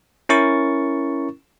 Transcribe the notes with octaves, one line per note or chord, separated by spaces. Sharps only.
C#4 E4 A#4 C#6 A6